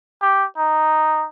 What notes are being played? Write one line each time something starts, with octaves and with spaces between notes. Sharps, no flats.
G4
D#4